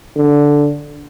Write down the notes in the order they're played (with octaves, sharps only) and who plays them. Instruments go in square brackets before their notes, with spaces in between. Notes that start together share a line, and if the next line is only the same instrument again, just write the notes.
[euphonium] D3